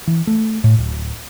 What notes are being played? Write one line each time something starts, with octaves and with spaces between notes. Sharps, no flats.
E3
A3
A2
D1